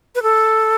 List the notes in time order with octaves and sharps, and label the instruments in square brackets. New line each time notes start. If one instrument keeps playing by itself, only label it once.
[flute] B4
A4